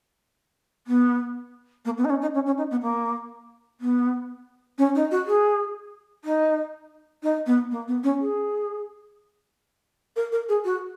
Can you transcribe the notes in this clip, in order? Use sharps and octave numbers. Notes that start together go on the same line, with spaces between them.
B3
A#3
B3
D#4
C#4
D#4
C#4
C#4
D#4
B3
A#3
B3
C#4
D#4
F#4
G#4
D#4
D#4
B3
A#3
B3
C#4
G#4
A#4
A#4
G#4
F#4